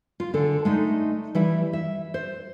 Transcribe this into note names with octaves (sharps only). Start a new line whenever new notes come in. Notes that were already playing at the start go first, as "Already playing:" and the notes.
F4
D3 A4 G#5
G#3 A3 D4 D#4
E3 G3 E4
E5
C5